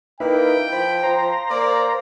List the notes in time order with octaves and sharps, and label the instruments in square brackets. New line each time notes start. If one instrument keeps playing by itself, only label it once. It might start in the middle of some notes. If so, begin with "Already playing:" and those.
[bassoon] A#3 [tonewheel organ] D#4 E4 B4 [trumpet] G5
[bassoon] F3 [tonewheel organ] B5
[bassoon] F3 [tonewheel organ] C5 A#5
[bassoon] A#3 [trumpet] D5